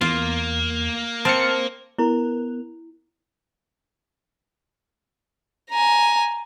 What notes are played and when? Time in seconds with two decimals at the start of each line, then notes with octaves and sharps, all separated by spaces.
0.01 E2 A#3 F4
1.25 C4 A5 F6 C#7
1.98 B3 E4 A#4
5.71 G#5 A#5